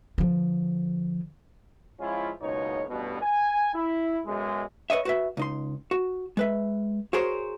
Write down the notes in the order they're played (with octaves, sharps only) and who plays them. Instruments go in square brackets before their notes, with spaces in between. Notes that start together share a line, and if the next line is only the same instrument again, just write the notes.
[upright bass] D3 F3
[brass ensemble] F3 G#3 C#4 E4 F4
F#1 C#2 B2 D#4 C#5
A1 G2 B2
G#5
E4
B1 F#2 G#3
[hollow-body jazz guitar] B4 C#5 D#5 E5
F#4 B4 E5
C#2 D#4 C6
F#4
G#3 B4 E5
F#4 G#4 A#4 C5 C#5